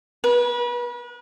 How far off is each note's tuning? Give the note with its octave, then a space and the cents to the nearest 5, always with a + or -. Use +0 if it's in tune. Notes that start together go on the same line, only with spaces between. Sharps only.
B4 -35